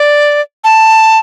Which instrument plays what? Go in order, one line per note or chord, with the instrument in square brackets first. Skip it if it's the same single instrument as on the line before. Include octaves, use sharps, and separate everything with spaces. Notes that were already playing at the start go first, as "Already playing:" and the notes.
Already playing: [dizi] D5
A5